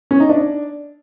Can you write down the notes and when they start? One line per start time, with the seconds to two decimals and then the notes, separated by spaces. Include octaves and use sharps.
0.11 C#4
0.20 D#4
0.29 D4